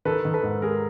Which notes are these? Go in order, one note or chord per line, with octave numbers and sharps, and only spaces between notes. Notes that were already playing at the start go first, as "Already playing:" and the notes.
D#3 A4 B4
D#3
A4 B4
G#2
G#3 G#4 A#4